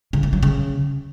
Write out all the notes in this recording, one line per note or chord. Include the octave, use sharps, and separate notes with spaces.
C#3
A3
F#3
C#3